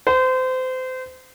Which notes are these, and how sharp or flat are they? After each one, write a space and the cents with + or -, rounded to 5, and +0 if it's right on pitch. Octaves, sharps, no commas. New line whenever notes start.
C5 -30